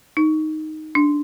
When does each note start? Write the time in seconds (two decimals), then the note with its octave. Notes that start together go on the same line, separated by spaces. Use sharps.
0.17 D#4
0.95 D4